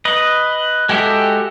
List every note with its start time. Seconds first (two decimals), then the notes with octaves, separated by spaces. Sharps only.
0.05 B4 D#5
0.89 G#3 F#4 G4 A4 E5